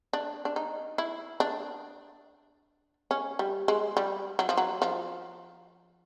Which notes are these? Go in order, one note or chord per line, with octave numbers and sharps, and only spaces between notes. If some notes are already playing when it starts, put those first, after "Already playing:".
D4
D4
D#4
E4
D4
C#4
G3
G#3
G3
F#3
F3
F#3
F3